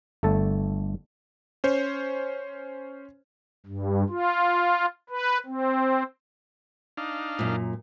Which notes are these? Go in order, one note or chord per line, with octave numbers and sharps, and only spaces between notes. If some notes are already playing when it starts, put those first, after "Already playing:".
G1 A3 A4 A5
C#4 C5 C#5
G2
F4
B4
C4
D4 D#4 F5
F#2 A#2